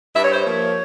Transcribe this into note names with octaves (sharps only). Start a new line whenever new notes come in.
G2 E5
C#5
C5
C#5
F3 A#3